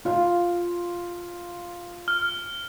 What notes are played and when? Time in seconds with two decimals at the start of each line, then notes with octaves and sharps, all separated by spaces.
0.05 F4 F5
2.08 F6